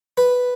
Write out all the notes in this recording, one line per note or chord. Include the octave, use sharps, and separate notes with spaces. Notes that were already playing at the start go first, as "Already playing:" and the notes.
B4